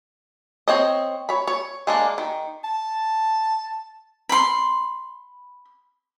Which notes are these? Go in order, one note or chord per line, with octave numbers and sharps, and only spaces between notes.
C4 C#5 D#5
C#5 B5
C#5
G#3 A#3 D4
D#3
A5
B5 C6